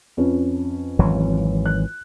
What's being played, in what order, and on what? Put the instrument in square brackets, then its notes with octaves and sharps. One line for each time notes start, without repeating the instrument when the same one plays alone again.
[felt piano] F2 C#4 B4
[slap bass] G#1 E3 F#3
[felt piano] F#6